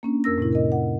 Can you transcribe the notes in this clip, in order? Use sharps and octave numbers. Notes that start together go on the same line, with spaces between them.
A#3 C#4 D4
F2 A#4 E6 A#6
A2 C3 E4
A#4 D#5
F#5